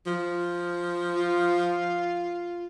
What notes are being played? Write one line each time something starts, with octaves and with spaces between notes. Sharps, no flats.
F3
F4